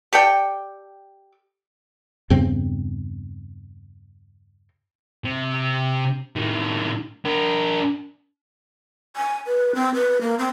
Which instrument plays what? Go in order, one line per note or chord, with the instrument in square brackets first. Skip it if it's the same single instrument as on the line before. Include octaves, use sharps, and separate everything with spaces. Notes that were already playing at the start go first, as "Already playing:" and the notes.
[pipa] G4 A4 D5 G5
[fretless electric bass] E2 G2 C#3 C4
[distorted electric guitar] C3
A2 D#3
D4 A#4
[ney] G#5
B4
C4
B4
A#3
C4